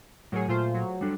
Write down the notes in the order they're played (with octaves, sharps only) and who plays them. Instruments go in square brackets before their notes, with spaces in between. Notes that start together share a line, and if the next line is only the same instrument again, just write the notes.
[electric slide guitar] A2 A#4 C#5 [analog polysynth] F#3 G#4
[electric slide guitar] A#2 [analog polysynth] A3 F4 C5
[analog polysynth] F#3
[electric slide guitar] G3 D4 A4